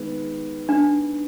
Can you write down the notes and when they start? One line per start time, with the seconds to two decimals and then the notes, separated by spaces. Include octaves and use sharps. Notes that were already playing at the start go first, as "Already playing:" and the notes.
Already playing: D#3 G#3 B3
0.69 D4